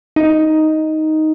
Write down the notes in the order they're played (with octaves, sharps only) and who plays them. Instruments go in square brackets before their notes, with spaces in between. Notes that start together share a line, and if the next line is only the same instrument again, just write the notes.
[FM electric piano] D#4